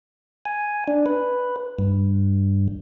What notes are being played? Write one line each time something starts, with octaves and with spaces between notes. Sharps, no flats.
G#5
D4
B4
G2